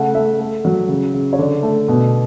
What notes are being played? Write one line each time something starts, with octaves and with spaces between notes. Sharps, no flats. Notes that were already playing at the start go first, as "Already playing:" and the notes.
Already playing: C#3 A3 F#5
A3 E5
A3
F#3
C#3
C#3
C#5
D3 D5
A3
B2